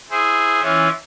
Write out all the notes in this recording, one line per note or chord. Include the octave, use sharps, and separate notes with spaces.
E4 G#4 C5
E3 C#4 E4 F4